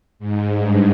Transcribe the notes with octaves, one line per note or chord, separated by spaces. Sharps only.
G#2
G2